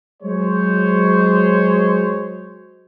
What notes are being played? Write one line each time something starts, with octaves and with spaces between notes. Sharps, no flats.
F#3 G#3 C5 C#5